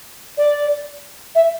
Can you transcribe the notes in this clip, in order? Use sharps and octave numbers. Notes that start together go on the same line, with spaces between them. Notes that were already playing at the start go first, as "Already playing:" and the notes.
D5
E5